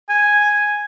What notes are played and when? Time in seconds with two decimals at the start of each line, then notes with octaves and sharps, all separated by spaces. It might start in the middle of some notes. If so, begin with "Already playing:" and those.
0.09 G#5